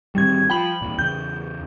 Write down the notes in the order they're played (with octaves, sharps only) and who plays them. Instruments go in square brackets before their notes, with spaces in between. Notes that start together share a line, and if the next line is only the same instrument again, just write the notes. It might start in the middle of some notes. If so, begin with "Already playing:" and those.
[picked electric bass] A1 D#3 C4 [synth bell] G3 G#6
[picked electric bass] F3 [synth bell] G5 B5 F#7
[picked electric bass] E2 A#2
[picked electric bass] E2 C#3 [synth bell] G6